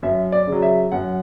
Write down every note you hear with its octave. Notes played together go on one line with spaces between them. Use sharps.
F#2 E5
D5
C#3 F#3
E5
F#2 F#5